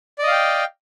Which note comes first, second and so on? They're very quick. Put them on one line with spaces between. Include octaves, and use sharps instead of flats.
D5 D#5 F5 G5